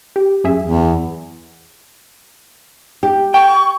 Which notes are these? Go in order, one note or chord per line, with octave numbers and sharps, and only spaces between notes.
G4
F#2 G#4 E5
E2
G4
G5 C#6